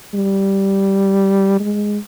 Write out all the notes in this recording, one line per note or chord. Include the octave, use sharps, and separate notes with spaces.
G3
G#3